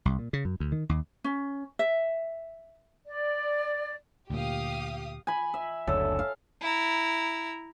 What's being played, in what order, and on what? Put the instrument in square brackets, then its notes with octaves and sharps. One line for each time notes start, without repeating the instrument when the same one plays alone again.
[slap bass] C2
A#2
C#3
F#2
D2
D#3
D#2
[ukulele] C#4
E5
[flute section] D5
[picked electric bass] D2 A#2 [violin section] G4 F5 D#6
[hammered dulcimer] G#5 B5
E5
[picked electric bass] F#1 D2 D3 [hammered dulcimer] A4 [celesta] C#5 E6
[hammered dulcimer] F5
[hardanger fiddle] E4 A#5